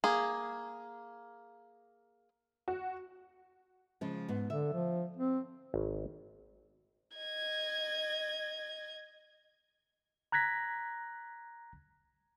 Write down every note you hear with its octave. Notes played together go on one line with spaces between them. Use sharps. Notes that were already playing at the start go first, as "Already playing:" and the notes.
A#3 G#4
F#4
C#3 F3 G#3
G#2 B3
D3 E5
F3
C4
G#1
D#5 G#6
A#5 F#6 G#6 A#6 B6